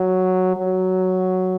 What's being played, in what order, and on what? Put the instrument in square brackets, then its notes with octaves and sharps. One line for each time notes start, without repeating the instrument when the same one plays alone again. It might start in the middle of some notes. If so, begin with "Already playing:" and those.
Already playing: [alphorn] F#3
F#3